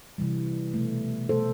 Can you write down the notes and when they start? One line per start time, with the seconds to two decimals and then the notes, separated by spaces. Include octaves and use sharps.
0.18 C3 E3 G3
0.74 B2 A3
1.29 B2 A3 A4 C5